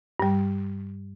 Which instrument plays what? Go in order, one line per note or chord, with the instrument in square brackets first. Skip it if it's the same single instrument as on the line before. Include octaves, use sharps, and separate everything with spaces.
[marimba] G2 G3